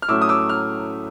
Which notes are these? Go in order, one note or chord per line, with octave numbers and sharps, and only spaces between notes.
F6
A2 F#3 A3 C#4 D6 E6
D#6
D6 E6
F6